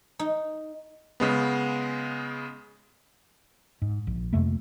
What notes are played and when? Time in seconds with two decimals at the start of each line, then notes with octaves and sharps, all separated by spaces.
0.19 D#4
1.20 C#3 G#3 B3
3.82 G#2
4.07 A#1
4.33 F2 C3 A3 A#3